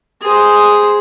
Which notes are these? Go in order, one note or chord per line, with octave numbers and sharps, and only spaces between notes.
G#4 C5